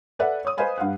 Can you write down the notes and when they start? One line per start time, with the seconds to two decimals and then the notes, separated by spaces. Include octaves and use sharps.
0.19 A4 B4 D5 E5 F#5
0.45 C#5 D#6
0.57 B4 C5 D#5 F5 G#5 B5
0.78 G2 F5 F#5